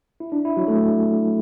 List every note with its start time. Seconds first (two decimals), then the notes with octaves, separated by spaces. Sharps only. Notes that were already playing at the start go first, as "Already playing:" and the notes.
0.20 E4
0.32 D4
0.45 E4
0.56 F#3 F#4
0.68 A3 A4